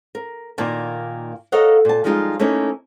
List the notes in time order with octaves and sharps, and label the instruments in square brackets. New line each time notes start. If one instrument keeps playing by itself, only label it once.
[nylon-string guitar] A#4
A#2 D#3 A#3 A5
A4 A#4 C#5 D#5 F5 F#5
A#2 A5
F3 G3 G#3 D#4 F4
A3 A#3 C#4 D#4 E4